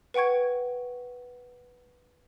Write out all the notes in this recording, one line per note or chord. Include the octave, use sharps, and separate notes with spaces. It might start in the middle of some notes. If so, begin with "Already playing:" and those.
B4 F#5 G5 C#6 G#6